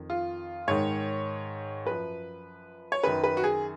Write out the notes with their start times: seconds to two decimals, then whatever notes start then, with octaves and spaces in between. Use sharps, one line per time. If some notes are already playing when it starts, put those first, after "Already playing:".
Already playing: F2 D#3
0.10 F4
0.68 G#2 D#3 C#5
1.85 F#2 F3 B4
2.92 C#5
3.03 F#2 D#3 B4
3.24 B4
3.37 F#4
3.44 G#4